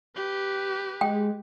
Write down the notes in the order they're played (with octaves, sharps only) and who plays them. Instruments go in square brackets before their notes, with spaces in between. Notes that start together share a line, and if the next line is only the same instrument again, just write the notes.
[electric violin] G4 B4
[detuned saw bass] G#3 [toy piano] G5